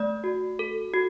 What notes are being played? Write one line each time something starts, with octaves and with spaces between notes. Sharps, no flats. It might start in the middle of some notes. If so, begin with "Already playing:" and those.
Already playing: A3 D5
F#4
A4
F#4